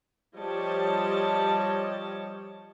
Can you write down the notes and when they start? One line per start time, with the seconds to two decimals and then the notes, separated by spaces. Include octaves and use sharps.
0.36 F3 G3 C#5 D#5 A5